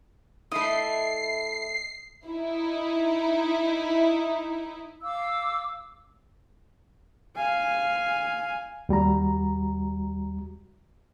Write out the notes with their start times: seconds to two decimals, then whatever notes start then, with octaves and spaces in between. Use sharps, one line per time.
0.52 A3 E4 D#5 B5 C7
2.26 D#4 E4
5.02 F5 D6 E6
7.36 F5 G#5
8.89 D#2 G3 F#4 A#5